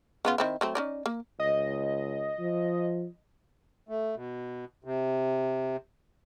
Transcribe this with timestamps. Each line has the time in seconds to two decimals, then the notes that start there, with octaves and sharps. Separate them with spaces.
0.25 C#3 B3 F4
0.38 D#3 C4 E4
0.61 F#3 A3 C4
0.75 C#4 D#4 D5
1.06 A#3
1.40 C#2 D#5
2.40 F3
3.89 A3
4.15 B2
4.84 C3